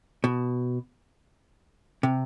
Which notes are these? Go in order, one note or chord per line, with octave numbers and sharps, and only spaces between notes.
B2
C3